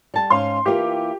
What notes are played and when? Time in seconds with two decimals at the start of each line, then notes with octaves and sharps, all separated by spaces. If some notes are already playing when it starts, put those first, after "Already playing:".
0.14 G3 A5
0.30 G#2 C#4 F5 C6
0.66 E3 A#3 F4 G4